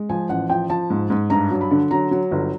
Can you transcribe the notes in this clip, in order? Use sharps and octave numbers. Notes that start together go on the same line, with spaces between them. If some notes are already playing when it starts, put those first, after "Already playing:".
Already playing: G#3
F3 G#5
A1 F#5
F3 G5
F3 A5
G#2
G#2
G2 A#5
F#3
B5
D3
F#3 A#5
F#3
G1